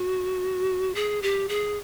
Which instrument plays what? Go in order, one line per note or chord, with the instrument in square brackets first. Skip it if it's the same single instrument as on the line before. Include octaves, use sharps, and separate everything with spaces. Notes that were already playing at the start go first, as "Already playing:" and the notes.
Already playing: [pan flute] F#4
G#4
G4
G#4